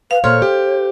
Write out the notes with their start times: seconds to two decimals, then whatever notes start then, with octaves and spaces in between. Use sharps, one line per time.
0.11 B4 F5
0.24 A#2 A4 C5 C#5 C6 F6
0.42 G4